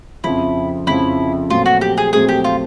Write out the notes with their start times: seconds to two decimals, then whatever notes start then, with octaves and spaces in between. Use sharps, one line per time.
0.24 F2 C#3 F3 E4
0.87 F2 C#3 F3 E4
1.50 A#2 F#3 A3 C4 F4
1.66 F#4
1.81 G4
1.98 G#4
2.13 A#2 F#3 A3 C4 G#4
2.29 G4
2.44 F4